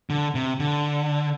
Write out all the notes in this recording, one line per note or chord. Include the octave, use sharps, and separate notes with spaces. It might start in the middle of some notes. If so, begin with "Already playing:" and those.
D3
C3
D3